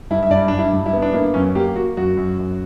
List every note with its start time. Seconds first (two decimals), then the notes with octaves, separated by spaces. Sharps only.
0.10 G2 E4
0.23 E5
0.30 G2 D5
0.48 G2 D4
0.58 E4
0.73 G2
0.86 E4
0.93 B3
1.02 D4
1.13 A#3 E4
1.34 F#2 C#4
1.55 A#3 G4
1.76 A#3 F#4
1.97 F#2 F#4
2.17 F#2
2.39 F#2